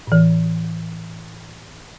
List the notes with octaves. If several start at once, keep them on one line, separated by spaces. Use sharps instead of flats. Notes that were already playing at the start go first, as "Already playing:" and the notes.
A2 E3